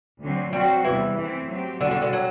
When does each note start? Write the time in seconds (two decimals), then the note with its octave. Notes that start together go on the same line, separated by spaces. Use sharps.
0.21 D2 D3 F#3 C4
0.53 F#3 G3 C4 F#4 C5
0.85 E2 C3 E3 G3
1.16 E3 A3 C4 E4
1.49 F#3 C4 G4
1.80 E2 B2 D3 G3 D4 F#4
1.91 D3
2.02 D3
2.13 F#3